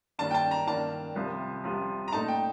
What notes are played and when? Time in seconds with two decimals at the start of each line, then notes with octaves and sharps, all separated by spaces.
0.19 G2 D#3 A#3 D4 A5
0.31 G5
0.34 A5
0.51 A#5
0.67 G2 D#3 A#3 D4 A5
1.16 C2 C3 F3
1.64 C2 C3 F3
2.08 A#5
2.12 A#2 A3 D#4 A5
2.28 G5